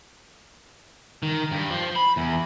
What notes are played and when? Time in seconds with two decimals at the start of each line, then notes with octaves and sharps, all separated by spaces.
1.23 D#3
1.52 G2
1.71 F3
1.96 B5
2.17 E2